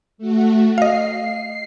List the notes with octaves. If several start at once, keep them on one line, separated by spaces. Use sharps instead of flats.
A3 F#4
D#5 F5 C7